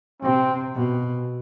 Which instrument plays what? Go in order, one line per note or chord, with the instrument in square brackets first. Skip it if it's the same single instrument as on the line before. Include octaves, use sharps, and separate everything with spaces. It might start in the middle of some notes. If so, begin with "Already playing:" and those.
[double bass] C3 [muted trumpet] C4
[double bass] B2